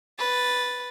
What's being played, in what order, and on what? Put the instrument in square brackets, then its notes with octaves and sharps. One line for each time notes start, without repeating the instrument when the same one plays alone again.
[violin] B4 A6